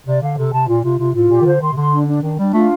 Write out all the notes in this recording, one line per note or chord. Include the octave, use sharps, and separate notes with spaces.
C3 D5
D3 F5
C3 A4
C3 A5
A#2 F4
C3 F4
C3 F4
A2 F4
A#2 G4
D#3
D3 C5
D#3 C6
C3
D3 C6
D4
D4
D#3 D4
G3 D4
A3 F4